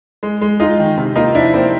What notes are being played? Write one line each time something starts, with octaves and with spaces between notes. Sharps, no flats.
G#3
G#3
G#3 D#4 F4
D#3
C3
A#3 D#4 F4
F3 D4 E4
A#3 C4